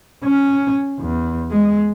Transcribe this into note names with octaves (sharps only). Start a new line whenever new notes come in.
C#4
E2
G#3